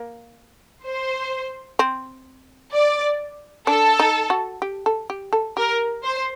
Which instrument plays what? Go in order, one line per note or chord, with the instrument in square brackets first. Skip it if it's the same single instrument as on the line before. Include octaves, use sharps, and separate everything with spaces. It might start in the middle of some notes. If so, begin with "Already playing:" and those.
Already playing: [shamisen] A#3
[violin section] C5
[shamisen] C4
[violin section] D5
[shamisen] D4 [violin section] A4
[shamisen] D#4
F#4
G4
A4
G4
A4
[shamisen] G4 [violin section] A#4
[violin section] C5